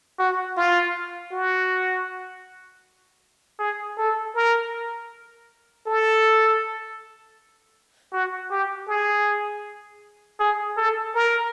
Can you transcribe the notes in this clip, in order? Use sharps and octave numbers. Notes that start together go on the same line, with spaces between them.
F#4
F4
F#4
G#4
A4
A#4
A4
F#4
G4
G#4
G#4
A4
A#4